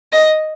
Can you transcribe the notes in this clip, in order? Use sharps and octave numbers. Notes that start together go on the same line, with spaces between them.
D#5